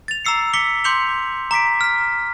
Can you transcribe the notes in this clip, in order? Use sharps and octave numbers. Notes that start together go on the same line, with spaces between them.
A6 F7
A#5 D6 E6 C7 C#7
D6 B6 C#7 G7
C6 D6 G6 C#7 F7 G7
A#5 D6 B6 D7
F6 B6